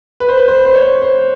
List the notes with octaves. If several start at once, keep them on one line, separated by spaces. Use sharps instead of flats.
B4
C5
B4
C5
C5
C#5
C5